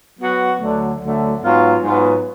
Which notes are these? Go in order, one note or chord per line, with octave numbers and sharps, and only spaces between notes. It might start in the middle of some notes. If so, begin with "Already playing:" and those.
F#3 B3 F#4
D2 D3 F#3 A3
D2 D3 F#3 A3
G#2 F#3 B3 F4
G#2 F#3 B3 F4